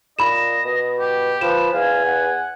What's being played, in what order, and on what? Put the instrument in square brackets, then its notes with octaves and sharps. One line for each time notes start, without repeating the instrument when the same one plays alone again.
[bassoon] A#2 [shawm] D#5 [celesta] B5 E7
[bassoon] B2
[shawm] G4
[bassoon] F3 [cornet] B4 [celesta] E7
[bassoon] E2 [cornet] F5 [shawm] G#5
[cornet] F#5